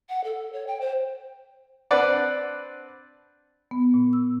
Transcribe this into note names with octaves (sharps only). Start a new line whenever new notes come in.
F#5
A4
C#5
G5
C5
C4 D4 B4 D5 F#5
B3
A#2
E6